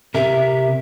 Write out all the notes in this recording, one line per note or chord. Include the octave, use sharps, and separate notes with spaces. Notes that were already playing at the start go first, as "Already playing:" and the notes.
C3 A#4 E5